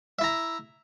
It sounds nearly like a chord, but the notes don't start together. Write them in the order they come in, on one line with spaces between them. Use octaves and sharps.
E5 E4 A#5